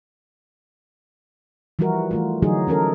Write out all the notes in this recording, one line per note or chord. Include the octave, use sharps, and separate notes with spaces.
E3 F3 G3 E4 F#4 A#4
E3 A3 F4
D3 E3 F#3 D#4 F#4 G#4
E3 C#4 A4 A#4